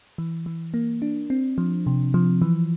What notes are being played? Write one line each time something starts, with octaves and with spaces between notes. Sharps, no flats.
E3
E3
A#3
D4
C4
F3
C3
F3
E3